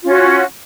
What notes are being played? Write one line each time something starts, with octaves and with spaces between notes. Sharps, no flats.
C#4 F4 F#4